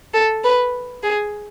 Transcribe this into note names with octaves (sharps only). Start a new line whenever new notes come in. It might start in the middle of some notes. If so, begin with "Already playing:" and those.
A4
B4
G#4